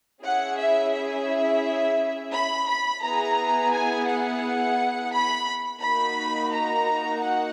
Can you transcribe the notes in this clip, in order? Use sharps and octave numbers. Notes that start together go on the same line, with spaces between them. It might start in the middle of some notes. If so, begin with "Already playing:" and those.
C#4 E4 G#4 F#5
E5
E5
B5
B5
B3 E4 G#4 A#5
G#5
F#5
B5
A#3 D#4 F#4 B5
A#5
F#5